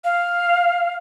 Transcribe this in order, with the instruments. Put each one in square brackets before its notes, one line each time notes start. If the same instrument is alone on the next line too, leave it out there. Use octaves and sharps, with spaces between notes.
[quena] F5